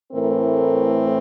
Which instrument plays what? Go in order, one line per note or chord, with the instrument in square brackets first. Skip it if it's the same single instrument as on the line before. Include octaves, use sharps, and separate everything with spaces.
[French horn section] A2 E3 A3 C4 A#4